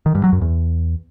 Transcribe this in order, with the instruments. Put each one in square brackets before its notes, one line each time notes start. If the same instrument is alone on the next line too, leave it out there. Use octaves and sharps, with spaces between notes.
[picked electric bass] D#3
G2
F#3
F#2
E2